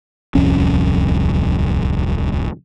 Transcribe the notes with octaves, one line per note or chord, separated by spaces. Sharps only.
D1 C2 F2 C#4